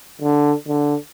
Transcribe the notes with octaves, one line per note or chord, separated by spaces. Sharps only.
D3
D3